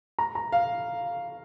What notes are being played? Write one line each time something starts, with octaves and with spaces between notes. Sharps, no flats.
A#5
A#5
F5